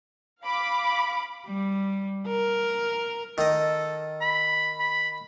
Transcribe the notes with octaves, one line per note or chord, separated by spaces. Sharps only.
F5 B5 D6
G3
A#4
D#3 A4 D#5
B5
B5